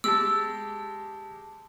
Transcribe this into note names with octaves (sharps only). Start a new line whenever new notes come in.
G#3 G4 A5 D6 E6